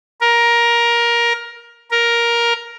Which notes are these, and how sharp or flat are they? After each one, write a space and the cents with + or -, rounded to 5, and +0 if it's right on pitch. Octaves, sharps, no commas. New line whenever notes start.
A#4 +15
A#4 +10